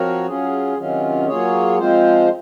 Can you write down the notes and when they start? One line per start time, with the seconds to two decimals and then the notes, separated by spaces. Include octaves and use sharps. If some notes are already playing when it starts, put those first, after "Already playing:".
Already playing: F3 C4 F#4 A#4 C#5
0.27 F#3 C#4 F4 G#4
0.78 C3 D#3 F#3 C#4 F4
1.28 F#3 A#3 F4 G#4 C#5
1.78 F3 G#3 C4 F4 C5